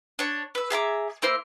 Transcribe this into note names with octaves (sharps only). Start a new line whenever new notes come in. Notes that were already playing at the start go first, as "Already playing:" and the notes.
D4 C#5
B4 E6
G#4 E5 A#5 D6
A#3 E4 C5 E6